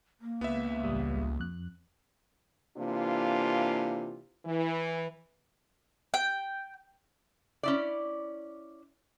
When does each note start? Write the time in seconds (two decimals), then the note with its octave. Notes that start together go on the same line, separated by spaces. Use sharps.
0.21 A#3
0.41 C#2 B3 E5
0.84 A1 G3 D#6
1.39 F2 F#6
2.78 C3 E3 A#3 D4 F4
4.46 E3
6.14 G5
7.63 C#4 E4 D5